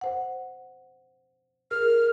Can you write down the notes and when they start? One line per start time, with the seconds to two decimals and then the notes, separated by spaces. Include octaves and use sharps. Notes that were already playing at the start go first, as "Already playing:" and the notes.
0.01 C5 F#5
1.71 G#4 A#4 F6